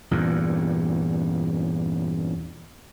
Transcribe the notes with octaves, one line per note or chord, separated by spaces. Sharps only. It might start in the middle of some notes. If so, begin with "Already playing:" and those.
E2 G2 A#2